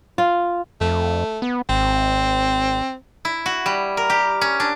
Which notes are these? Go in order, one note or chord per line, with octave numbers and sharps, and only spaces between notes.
F4
F2 A3
B3
G#1 C4
E4
F#4
G3
A#4
G4
C#4
D4